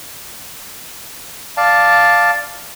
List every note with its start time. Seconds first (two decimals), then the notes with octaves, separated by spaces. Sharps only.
1.57 D5 F5 A5